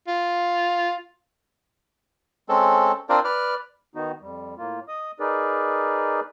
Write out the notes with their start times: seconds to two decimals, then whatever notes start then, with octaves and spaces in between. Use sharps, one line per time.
0.08 F4
2.49 G#3 C4 C#4 A4
3.09 C4 D4 F4 A#4 C5 D5
3.24 B4 D5 F6
3.95 D#3 B3 D#4 F#4
4.21 F2 G3
4.58 A2 A#3 F4
4.88 D#5 D#6
5.20 D#4 G#4 A#4 B4 D5